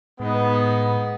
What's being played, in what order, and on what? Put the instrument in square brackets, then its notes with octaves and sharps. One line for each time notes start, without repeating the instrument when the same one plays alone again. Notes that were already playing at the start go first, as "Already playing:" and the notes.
[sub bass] A2 [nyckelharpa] G#3 D#4 [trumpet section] B3